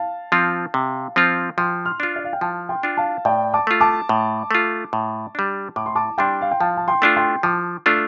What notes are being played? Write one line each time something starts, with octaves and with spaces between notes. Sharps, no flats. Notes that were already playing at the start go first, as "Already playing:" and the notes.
Already playing: F5 A5
F3 C4 F4
C3
F3 C4 F4
F3 G5 C6
C6 F6
D4 F4
D5
F5
G5
F3 F5 A5
G5 C6
D4 F4
F5 A5
A2 D5 G5
A5 D6
A3 F4
A5 D6
A2
A3 F4
A2
G3 D4
A2 D6
C6
A5 D6
G3 D4 G5 C6
F5
G5
F3 F5 A5
A5
G5 C6
A3 D4 F4
G5 C6
F3 A5 D6
A3 D4 F4 F6